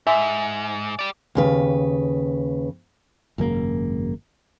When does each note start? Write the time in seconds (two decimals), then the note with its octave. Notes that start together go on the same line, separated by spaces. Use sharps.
0.07 G#2 E5 G#5 C6
0.99 G4 D5
1.35 D#2 C#3 B4
3.38 G#1 F#2 C#3 A#3